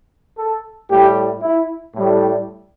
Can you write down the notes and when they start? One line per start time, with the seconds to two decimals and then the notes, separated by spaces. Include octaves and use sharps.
0.38 A4
0.90 A2 G3 G4
1.42 E4
1.95 A2 G3